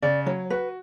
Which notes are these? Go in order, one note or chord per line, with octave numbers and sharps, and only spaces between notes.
C#3 D5
F#3 C#5
F#4 B4